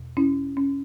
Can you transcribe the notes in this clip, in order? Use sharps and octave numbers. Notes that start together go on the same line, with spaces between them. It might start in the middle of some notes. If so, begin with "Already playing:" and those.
Already playing: E2 B2
C#4 E4
C#4